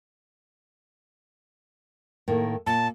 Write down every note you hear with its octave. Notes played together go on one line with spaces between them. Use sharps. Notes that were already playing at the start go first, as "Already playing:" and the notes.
A2 D#3 A#3
A#2 A5